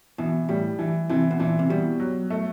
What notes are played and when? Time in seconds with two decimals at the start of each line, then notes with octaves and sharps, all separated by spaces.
0.18 B2 E3
0.49 A2 G3
0.79 E3
1.09 C3 E3
1.31 B2
1.39 A#2 E3
1.59 C3
1.69 B2 G3
2.00 F#3
2.30 A3